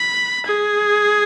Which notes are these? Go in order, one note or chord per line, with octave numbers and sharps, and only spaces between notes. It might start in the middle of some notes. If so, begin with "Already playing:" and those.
Already playing: B5
G#4